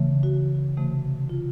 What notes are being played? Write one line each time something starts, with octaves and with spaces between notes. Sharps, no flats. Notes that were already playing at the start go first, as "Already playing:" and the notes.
Already playing: C#3 E3 A3
F#4
C3 E3 A3
F4